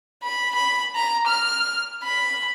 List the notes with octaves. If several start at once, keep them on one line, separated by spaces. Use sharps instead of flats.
B5
B5
A#5
F6
B5